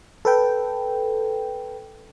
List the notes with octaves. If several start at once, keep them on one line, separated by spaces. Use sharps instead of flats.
A4 B4 G5